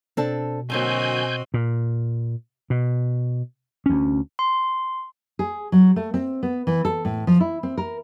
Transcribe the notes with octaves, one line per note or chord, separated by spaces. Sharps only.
B2 C4 D4 A4
D3 F#3 A#3 C4 F#4 D#5 G#5 G6
A#2
B2
D2 C#4
C6
G#4
F#3
A3
C4
B3
E3
A4
A2
F3
E4
C4
A#4